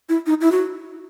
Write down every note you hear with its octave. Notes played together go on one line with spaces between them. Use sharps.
E4
D#4
E4
F#4